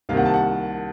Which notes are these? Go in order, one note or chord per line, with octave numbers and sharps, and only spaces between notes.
C2 C3 D#3 A#3 F5
F#5
A5
F#5